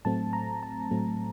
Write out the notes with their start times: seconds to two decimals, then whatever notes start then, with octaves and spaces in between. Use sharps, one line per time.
0.05 A2 F#3 A3 C4 A5
0.33 A#5
0.63 A5
0.91 A2 F#3 A3 C4